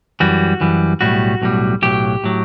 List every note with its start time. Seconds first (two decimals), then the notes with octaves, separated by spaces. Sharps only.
0.20 F#2 E3 G3 F#4
0.60 F#2 E3 G3
1.01 B1 A2 G3 F#4
1.42 B1 A2 G3
1.82 B1 A2 F#3 G4
2.24 A2 F#3